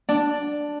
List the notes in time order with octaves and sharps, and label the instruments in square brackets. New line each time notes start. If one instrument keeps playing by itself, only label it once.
[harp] D4